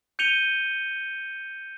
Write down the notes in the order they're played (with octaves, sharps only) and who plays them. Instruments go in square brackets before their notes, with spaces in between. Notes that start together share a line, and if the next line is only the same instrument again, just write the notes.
[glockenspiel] G6 C#7 D#7 F7 G7